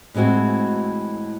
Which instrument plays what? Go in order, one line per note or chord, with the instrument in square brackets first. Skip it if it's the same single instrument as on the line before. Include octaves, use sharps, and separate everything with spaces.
[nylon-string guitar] A2 E3 G#3 C4 F#4